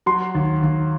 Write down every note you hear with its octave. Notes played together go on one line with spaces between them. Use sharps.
F#3 C6
D#2
D#2